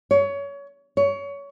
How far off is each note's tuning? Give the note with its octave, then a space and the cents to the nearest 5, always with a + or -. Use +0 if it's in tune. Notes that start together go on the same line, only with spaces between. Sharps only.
C#5 +25
C#5 +25